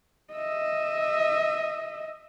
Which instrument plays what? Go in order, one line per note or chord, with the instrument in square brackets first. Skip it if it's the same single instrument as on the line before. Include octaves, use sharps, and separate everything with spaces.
[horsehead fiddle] D#5 E5